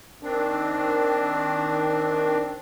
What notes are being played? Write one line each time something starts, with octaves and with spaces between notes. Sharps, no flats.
D#3 C4 D4